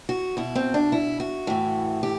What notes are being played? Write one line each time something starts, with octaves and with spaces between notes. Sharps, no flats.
F#4
B2 E4
C4
D4
E4
F#4
A2 E3
G4